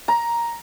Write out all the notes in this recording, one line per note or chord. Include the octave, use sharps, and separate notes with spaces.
A#5